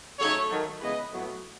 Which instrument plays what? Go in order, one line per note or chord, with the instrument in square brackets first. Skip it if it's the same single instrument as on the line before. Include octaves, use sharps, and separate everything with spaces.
[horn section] C#3 F#3 A3 D#4 A4 C#5
D#3 F#3 A3
C#3 E3 G#3 B3 B4 D#5
A2 F#3 B3